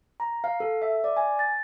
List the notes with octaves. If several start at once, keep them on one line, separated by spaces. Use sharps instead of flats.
A#5
F5
A4
E5
D5
G#5
A6